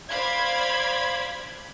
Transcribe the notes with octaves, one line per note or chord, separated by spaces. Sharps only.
C5 D5 F5 B5 G#6